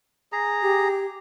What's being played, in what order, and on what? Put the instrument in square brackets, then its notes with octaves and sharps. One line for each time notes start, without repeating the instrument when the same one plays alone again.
[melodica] G#4 A#5
[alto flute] G4